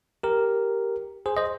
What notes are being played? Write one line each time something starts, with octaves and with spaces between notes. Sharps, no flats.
G4 A#4
G#4 C5
C5 D#5